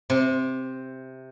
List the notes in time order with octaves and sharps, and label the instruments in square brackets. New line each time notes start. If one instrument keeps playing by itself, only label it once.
[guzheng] C3